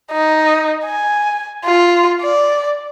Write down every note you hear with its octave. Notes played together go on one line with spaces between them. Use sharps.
D#4
G#5
F4
D5